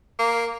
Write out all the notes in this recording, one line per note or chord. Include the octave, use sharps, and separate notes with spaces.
A#3